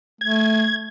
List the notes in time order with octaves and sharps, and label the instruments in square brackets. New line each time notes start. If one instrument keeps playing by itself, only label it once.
[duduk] A3 [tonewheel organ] G#6